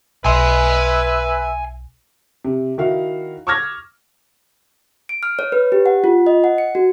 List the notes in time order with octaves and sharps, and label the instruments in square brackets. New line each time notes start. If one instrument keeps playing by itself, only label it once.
[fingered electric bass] B1 [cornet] B4 [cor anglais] E5 [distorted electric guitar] G#5 C6
[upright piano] C3
D#3 E4 F#4 F5
C#6 D6 E6 F6 G#6 A#6
[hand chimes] D7
F6
C#5
B4
G4
F#5
F4
D#5
F#5
C#7
F#4